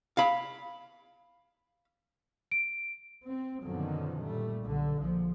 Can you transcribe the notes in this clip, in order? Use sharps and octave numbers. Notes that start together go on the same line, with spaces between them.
F5 B5
D7
C4
F#2 B2 D3 D#3 F3 F#3
A#2 G3 A3
B1 D3
A#1 A#2 F3